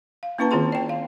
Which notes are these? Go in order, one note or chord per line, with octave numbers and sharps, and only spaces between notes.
F5
A#3 C#4 E4 B4 A5 A#5
D#3 C4 F4 G#4 C6
D5 G5
F5